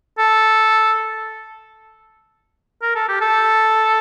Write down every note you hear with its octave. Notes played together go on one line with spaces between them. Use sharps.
A4
A#4
A4
G4
A4